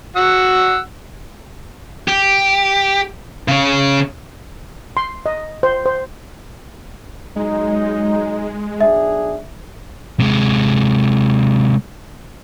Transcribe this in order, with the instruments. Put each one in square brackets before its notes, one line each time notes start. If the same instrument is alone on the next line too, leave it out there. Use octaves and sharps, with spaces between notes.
[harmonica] F#4 F#5 E6
[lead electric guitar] G4
C#3 C#5
[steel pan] C6
D#5
C5
C5
[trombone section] F#3 D#4 [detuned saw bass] G#3
[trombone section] B1 D4 G#4 [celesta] E5
[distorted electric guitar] C3 G#3